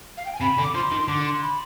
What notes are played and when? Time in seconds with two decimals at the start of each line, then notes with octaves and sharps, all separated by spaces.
0.17 F5
0.25 G5
0.33 G#5
0.40 C3 B5
0.58 D3
0.63 D6
0.74 F3 C6
0.91 D#3
1.00 C6
1.08 D3 D6
1.25 C6
1.42 B5